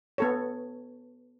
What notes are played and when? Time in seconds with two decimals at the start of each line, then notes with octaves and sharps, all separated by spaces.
0.18 B3 A4 C#5